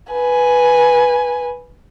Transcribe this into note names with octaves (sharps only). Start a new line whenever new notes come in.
B4 G#5